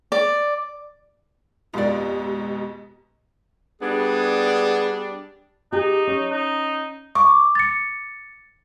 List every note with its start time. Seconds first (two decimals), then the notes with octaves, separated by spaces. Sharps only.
0.12 D5
1.74 F2 G#2 B2 F4 G4 D5
3.82 G3 B3 D4 G#4
5.72 D#4 G4 G#4
6.07 C#4
6.31 D#4
7.15 C#6 D6
7.55 A6 C#7